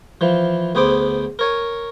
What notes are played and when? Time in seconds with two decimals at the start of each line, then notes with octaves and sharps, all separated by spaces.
0.21 E3 F3
0.75 D2 B3 G#4 C5 D6
1.39 A#4 C#5 G#5